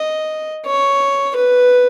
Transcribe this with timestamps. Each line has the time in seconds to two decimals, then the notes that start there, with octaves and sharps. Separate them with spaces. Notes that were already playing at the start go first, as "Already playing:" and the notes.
Already playing: D#5
0.66 C#5
1.36 B4